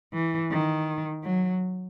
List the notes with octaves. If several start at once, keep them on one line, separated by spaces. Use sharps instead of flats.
E3
D#3
F#3